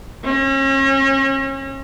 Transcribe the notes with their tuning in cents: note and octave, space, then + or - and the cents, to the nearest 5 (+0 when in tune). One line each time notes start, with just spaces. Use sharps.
C#4 -35